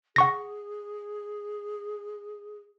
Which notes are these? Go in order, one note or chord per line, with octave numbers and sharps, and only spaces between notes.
G#4 F#5 C#6 A#6